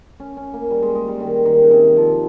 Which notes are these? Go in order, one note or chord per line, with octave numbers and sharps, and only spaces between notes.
C#4
C#4
A#3
G3
G#3
G#3
G3
D#3
D#3
C#3
C3
F3